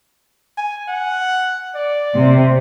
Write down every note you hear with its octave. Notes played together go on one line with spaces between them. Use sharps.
G#5
F#5
D5
C3